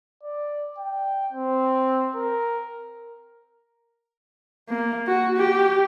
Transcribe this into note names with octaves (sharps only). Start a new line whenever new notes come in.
D5
G5
C4
A#4
A#3
F#4
G4